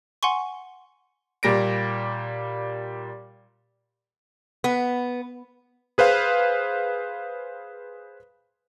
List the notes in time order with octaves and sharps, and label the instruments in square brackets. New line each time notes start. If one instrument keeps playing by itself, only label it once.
[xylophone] F#5 G#5 C6 C#6
[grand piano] A#2 G3 A#6 D7
[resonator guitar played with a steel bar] B3
[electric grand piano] G#4 B4 C5 F5